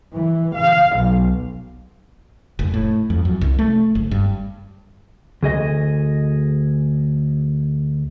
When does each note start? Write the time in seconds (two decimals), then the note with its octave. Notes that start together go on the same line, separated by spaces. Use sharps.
0.15 E3
0.56 F5
0.97 B1
2.59 F1
2.74 A2
3.10 F2
3.25 F#2
3.41 C2
3.59 A3
3.95 F#1
4.11 G2
5.43 D2 G#4 D#5